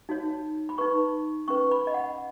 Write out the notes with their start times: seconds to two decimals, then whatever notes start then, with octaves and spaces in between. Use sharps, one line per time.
0.09 D#4 F#4 C#5
0.69 B5
0.78 D#4 B4 C#6
1.48 C#4 B4 C#6
1.71 B5
1.87 D#5
1.94 F#5